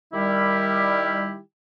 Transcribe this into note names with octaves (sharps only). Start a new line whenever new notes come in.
D#3 G3 E4 G4